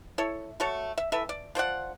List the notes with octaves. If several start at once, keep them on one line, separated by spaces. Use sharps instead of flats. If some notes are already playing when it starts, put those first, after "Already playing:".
E4 A4 C#5
A3 F#4 A4 C#5
E5
E3 A4 B4 E5
D5
F3 C5 D5 F#5